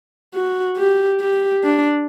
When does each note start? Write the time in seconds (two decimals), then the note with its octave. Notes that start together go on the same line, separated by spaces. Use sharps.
0.34 F#4
0.77 G4
1.20 G4
1.64 D4